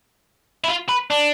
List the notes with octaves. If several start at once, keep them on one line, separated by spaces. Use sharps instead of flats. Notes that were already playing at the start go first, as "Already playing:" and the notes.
E4
F4
B4
D4